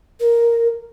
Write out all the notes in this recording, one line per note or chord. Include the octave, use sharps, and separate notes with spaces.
A#4